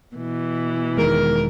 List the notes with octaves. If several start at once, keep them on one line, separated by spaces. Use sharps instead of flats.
B2 E3
E1 D#3 G#3 A#4